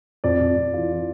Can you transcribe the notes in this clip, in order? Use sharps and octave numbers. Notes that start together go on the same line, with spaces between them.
F2 D5
F2
F2
E3 F4
E3